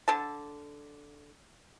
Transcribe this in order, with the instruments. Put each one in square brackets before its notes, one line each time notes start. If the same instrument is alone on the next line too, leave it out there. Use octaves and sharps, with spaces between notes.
[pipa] D3 A4 A5